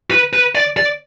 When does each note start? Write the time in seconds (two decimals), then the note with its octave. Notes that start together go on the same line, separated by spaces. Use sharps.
0.11 B4
0.33 B4
0.55 D5
0.77 D5